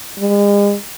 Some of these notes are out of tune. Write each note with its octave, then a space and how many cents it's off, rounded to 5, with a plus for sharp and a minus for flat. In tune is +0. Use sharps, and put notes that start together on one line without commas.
G#3 -40